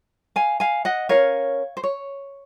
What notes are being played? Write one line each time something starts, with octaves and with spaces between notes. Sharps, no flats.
F5 G#5
F5 G#5
D#5 F#5
C#4 F4 A#4 C#5 F5
C5
C#5